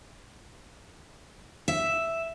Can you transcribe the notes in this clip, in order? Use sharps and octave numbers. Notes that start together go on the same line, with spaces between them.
E5